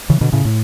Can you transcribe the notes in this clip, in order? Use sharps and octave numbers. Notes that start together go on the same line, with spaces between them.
C#3 E3
B2 D3
A2 C#3
A2